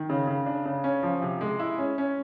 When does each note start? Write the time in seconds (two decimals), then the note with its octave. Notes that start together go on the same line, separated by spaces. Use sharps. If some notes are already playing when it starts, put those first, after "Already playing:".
Already playing: D#3
0.09 C#3
0.27 C#3
0.46 D4
0.65 C#3
0.84 C#4
1.03 F3
1.22 C3
1.41 G#3
1.59 E4
1.78 C#4
1.98 C#4